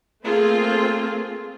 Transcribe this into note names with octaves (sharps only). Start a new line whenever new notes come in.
A3 A#3 C4 F4 G#4